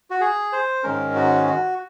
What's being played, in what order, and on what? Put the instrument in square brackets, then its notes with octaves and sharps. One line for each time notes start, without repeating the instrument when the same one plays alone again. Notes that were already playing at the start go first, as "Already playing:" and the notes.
[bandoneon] F#4
G#4
C5
G#2 D#3 G#3 C#4 A#4
F#4
F#4